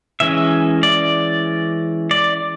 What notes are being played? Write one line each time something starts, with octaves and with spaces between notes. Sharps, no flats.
E3 G#3 C#4 E5
D5
D5